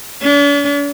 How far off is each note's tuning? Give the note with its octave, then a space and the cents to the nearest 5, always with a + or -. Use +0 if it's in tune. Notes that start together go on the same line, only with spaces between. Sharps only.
D4 -45